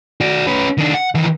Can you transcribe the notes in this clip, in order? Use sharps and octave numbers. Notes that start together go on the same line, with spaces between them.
F#4 D5
C#4 B4
D#3 D4
F#5
D#3 E3